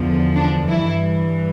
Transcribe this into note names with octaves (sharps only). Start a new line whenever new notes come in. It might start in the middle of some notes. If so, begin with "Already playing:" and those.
Already playing: E2 D3 F3
D4
G2 E3 E4